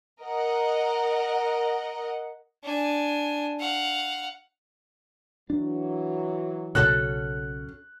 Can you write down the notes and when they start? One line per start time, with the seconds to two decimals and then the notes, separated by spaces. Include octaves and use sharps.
0.21 A#4 D#5 F#5
2.64 D4 G#5
3.60 F5 F#5
5.50 E3 F#3 D4
6.75 B1 C#3 C#4 F#4 A4 F#6